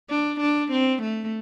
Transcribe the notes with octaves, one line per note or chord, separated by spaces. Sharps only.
D4
D4
C4
A3